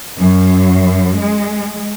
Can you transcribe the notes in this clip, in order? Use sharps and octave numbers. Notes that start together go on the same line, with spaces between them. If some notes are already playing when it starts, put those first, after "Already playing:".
F#2
G#3